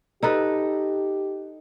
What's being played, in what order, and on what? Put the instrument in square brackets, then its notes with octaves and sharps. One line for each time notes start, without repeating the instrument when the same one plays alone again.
[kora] D#4 A4 B4 [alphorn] G4